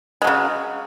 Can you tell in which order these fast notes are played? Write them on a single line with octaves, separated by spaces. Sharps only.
G#3 F#3 C#3